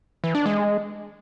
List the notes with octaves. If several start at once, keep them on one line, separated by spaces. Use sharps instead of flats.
E3
D4
G#3